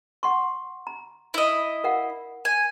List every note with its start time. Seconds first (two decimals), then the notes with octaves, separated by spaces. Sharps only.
0.23 F#5 C6 C#6
0.87 A#5
1.34 E4 D#5
1.84 A#4 F5 F#5
2.45 G#5